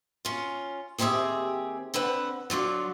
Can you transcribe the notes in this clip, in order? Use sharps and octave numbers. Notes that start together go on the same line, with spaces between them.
C#4 F4
D#2 C4 E4 G4 G#4 E5
D3 C4 B4 F#5
D3 F#3 F4 D5